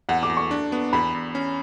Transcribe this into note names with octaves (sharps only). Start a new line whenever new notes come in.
E2 F#5
D6
E2
C#6
D4
B3
E2 B5
E2
C#4